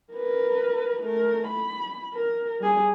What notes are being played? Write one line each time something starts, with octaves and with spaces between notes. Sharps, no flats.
A#4 B4
A3 A#4
B5
A#4
G3 G#4